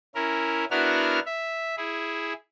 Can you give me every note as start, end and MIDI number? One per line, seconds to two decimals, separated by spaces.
0.15 0.65 61
0.15 0.65 64
0.15 0.65 70
0.71 1.20 59
0.71 1.20 62
0.71 1.20 64
0.71 1.20 66
0.71 1.20 70
0.71 1.20 89
1.26 1.75 76
1.77 2.33 64
1.77 2.33 68